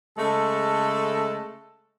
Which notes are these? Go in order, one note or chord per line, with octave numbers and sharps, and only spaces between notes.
C#3 G#3 A3 A4